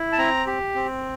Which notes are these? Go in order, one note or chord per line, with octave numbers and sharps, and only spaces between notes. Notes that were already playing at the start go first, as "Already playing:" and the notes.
Already playing: E4
A5
C4 A#5
G4
C4